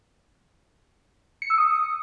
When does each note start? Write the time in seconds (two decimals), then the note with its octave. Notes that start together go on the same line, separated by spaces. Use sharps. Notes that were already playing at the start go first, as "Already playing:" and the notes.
1.42 C#7
1.50 E6
1.58 D#6